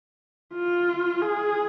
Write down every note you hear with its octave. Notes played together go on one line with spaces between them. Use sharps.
F4
G#4